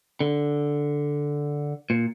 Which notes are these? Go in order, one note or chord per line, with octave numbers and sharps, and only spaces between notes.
D3
A#2